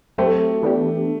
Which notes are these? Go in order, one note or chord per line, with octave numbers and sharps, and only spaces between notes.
F#3 A3 C4 G4
E3 B3 D4 G4